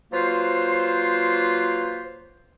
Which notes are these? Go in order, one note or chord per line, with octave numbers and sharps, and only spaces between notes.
F#3 A#3 F4 B4 C5